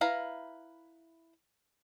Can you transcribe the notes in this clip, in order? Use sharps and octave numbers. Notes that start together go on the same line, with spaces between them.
E4 B4 F5 A#5